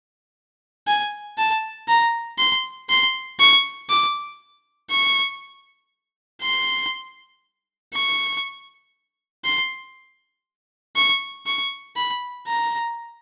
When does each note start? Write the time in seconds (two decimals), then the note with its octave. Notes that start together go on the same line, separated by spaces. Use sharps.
0.87 G#5
1.38 A5
1.88 A#5
2.39 C6
2.90 C6
3.40 C#6
3.90 D6
4.91 C#6
6.42 C6
7.94 C#6
9.45 C6
10.96 C#6
11.46 C#6
11.97 B5
12.48 A#5